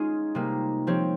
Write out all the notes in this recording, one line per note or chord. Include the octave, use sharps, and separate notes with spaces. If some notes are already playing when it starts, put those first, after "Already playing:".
Already playing: G#3 C#4 D#4 F4 G#4 D#5
C3 G3 A#3 D#4
F3 C4 G4 C#5